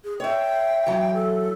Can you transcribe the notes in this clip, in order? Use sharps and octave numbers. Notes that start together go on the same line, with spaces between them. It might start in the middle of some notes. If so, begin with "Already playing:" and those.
G#4
C#5 E5 G5
E3 F#3
A4